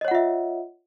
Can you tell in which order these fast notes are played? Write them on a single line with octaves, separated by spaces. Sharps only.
D#5 C#5 F#5 F4 E5